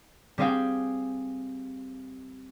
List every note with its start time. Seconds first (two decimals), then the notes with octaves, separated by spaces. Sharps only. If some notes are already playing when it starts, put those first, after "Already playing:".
0.38 G3 C4 G#4 F5 G5